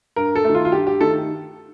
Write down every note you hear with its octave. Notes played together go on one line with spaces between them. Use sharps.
G2 A#4
A4
D#3 A3
F4
F4
G2 G4
G4
D#3 A3 A4